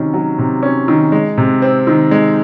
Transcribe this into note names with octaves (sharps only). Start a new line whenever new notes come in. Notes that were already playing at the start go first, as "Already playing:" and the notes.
Already playing: C3 D#3 F#3 C#4
F#3
C3
C#4
D#3
G#3
C3
C4
D#3
G#3